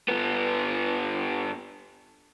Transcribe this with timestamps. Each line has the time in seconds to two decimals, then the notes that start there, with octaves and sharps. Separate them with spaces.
0.08 G2 B3